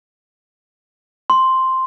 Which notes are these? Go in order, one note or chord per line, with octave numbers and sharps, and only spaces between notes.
C6